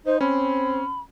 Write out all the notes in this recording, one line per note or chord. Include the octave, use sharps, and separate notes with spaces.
D#4 C5
C4 C#4 B5